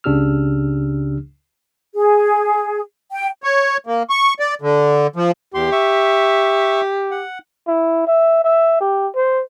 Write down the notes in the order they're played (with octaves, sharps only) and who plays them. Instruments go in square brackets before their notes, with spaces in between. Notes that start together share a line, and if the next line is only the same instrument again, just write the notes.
[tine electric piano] C#2 C#3 D4 G4 E6 F6
[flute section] G#4
G5
[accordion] C#5
A#3
C#6
D5
D3
F3
[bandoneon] E2 C6 [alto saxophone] G4
[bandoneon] E5 C#6
F#5
[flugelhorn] E4
E5
E5
G4
C5